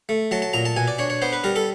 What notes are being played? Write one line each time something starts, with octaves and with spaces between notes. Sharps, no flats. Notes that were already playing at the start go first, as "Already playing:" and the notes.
A3
F#3 A5
A5
A#2 A#5
A5
B2 G#5
D5
D4 C#5
C#5
B3 C5
B4
G3 A#4
A4